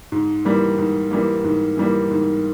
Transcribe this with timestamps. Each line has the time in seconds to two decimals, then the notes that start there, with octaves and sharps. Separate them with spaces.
0.12 G#2
0.45 E3 G3 A#3
0.78 G#2
1.11 E3 G3 A#3
1.44 G#2
1.77 E3 G3 A#3
2.11 G#2